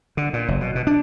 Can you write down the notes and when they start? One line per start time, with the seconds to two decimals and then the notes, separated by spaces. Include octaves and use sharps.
0.17 D3
0.33 A#2
0.48 F#1
0.61 B2
0.75 B2
0.87 D4